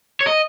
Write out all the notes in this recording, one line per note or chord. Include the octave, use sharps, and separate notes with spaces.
C#5
D#5